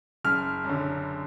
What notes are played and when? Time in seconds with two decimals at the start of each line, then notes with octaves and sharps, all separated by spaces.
0.24 F#1 F6
0.64 F#2 D3